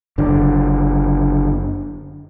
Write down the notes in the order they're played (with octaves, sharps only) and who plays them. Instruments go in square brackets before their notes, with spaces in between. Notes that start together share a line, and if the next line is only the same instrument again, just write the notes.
[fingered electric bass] F#1 D3